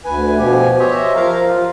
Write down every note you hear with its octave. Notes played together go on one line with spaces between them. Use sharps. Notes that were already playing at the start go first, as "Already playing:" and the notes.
D2 B4 G#5
B2 F3 G4 G#5
G4 C5 C#5 D#5 E5
F3 A#4 F5 A#5
F4